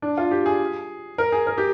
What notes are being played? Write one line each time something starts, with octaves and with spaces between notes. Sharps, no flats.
D4
F4
G4
G#4
A#4
G#4
A#4
G4